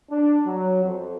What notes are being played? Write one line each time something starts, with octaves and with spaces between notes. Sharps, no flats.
D4
F#3
F2